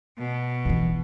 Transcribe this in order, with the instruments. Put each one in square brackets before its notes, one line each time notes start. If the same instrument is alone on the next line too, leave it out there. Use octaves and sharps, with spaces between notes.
[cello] B2
[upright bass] D3 E3